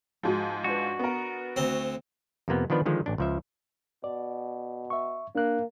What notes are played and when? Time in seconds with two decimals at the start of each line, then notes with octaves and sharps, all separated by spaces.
0.23 G#2 F3 F#4 G#4
0.64 D4 F#4 B4
0.99 B3 A#4
1.56 D2 C4
2.48 F2 C3 A#3 B3
2.70 D#3 F3 B3 D4 B4
2.86 D3 D#3 F3 G#3
3.06 A1 D4
3.18 C#2 F3 E5
4.04 B2 D5
4.90 E5 C#6
5.35 A#3 D4 F#6